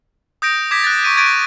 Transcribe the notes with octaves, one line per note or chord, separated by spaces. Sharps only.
D#6 G6 A#6 D7
D6 G#6 B6
F#6 A6
C#6 D7 D#7
C#6 G#6 A6 D7 D#7